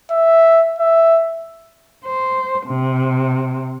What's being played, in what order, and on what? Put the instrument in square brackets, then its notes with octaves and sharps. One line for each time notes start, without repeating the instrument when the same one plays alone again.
[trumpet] E5
E5
[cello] C5
C3